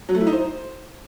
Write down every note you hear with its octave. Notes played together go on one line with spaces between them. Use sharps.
F#3
A3
E4
D#4
C5